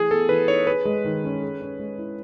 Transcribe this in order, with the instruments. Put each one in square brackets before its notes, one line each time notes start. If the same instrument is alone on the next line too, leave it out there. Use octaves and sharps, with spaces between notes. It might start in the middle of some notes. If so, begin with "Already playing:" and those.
Already playing: [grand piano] E3 A3 [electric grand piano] G#4
[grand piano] B3 [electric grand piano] A4
[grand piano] E3 [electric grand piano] B4
[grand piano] D#4 [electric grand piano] C#5
[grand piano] G#4 [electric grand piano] B4
[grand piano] G#3
D#3
C#4
G#4
C#4
G#3
E4